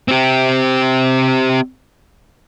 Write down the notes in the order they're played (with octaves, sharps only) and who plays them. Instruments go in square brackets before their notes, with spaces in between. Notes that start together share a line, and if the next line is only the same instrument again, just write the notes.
[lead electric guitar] C4 G4